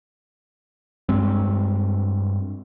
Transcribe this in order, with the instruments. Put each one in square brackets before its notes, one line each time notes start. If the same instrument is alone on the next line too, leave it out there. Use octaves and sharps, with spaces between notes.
[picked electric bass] G2 G#3 C4